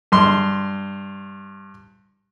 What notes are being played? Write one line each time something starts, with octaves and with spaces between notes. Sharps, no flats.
G2 C6